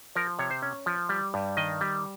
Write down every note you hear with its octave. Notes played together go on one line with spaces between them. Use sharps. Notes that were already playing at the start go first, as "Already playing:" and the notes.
F3 A#4
C3 C#5
C5
C#4
F3
G3
G2
D#3 D#5
G3